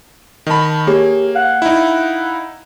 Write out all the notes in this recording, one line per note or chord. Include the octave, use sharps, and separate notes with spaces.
D#3 D#5 A5 B5
A#3 G4 G#4 C#5
F5 F#5 F#6
D#4 E4